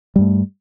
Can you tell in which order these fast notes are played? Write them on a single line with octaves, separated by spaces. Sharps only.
G3 G2 A3